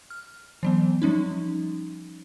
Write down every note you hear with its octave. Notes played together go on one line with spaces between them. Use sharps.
F6
E3 F#3 B3
F3 G3 C#4 D#4